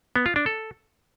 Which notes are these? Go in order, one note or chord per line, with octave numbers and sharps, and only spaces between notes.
B3
F4
D4
A4